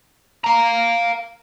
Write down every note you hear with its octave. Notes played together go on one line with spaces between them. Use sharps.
F5 A#5